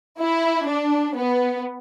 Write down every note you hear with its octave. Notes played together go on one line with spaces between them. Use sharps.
E4
D4
B3